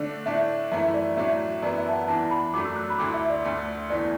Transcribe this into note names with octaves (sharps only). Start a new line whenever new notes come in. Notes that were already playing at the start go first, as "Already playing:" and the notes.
Already playing: D3 A3 D4 D5
A2 A3 D4 E5
F#2 E3 A3 E4 E5
D5
A2 F#3 A3 D4 E5
F#2 E3 B3 E4 D5
E5
A5
F#5
E2 E3 D4 A5
B5
F#2 F#3 A3 D4 D6
E6
F#6
B5
D2 D3 A3 E4 D6
E5
D5
D2 D3 A3
E2 E3 A3 D5